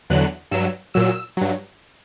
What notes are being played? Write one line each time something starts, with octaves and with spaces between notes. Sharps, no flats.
E2 D3 F#3 F#6
G2 F#3 E6
A#2 F#3 E6
G2 F#3